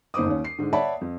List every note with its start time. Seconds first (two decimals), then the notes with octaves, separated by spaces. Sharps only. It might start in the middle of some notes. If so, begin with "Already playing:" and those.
0.14 F#1 D#4 C5 D6 D#6
0.26 D#2 C#4
0.44 C7
0.59 G#2 D3
0.73 C#5 D5 E5 F#5 A5 B5
1.01 F2